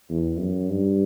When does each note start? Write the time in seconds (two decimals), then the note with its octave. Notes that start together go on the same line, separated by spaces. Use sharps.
0.10 E2
0.39 F#2
0.69 G2